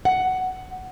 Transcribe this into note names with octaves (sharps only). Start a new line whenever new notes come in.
F#5